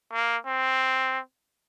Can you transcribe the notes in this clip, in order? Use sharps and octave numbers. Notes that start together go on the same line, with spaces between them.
A#3
C4